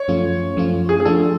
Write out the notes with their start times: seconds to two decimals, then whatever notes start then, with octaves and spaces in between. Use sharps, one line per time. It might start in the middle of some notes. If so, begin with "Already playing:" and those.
Already playing: C#5
0.08 F#2 F3 A3 C#4 F4
0.57 F#2 F3 A3 C#4 F4
0.89 G#4
1.00 G#4
1.05 F3 A3 D4 F4 A4